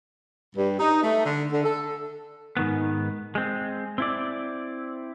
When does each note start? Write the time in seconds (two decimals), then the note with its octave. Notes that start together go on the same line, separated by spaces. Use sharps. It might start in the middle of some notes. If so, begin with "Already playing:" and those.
0.56 G2
0.79 D#4
1.03 A3
1.25 D3
1.51 D3
1.64 A4
2.57 G#2 D#3 B3
3.35 G#3 C4
3.98 C4 E4 D5